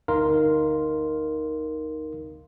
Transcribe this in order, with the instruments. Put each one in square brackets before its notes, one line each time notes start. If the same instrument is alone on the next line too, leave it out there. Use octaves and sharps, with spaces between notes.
[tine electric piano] G1 D2 D#4 A#4 F5 C6